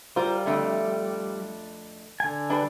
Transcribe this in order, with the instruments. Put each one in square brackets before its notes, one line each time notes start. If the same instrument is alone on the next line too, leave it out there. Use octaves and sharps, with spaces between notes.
[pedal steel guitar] G3 [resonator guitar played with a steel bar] F4 A#4 C5
[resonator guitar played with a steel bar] F2 D3 A3
[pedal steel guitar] D3 G#5
[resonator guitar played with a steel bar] G3 D4 B4